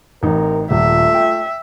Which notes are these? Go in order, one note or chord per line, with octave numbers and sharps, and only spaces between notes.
A1 C3 D#4 A#4
D#1 A3 F4 E5
G5